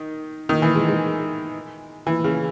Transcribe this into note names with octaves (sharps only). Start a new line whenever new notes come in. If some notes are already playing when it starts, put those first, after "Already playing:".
Already playing: D#3
D#3
E3
G#3
G#3
E3
C#3